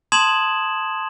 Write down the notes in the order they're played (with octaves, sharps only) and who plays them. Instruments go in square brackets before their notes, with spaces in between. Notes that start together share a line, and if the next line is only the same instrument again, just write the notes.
[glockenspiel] A5 C6 D#6 G#6 E7 F#7